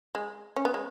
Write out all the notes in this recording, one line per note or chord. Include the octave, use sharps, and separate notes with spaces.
G#3
C#4
B3
G#3